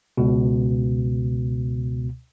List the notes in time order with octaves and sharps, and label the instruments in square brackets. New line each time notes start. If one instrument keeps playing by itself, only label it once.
[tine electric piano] C#2 B2